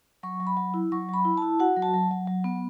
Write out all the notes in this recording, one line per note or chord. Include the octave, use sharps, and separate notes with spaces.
F#3 C#6
F#3
B5
F#3
E4
F#3 C#6
F#3 B5
E4
E4 A5
F#4 F#5
F#3
A5
F#3
F#3
F#3
B3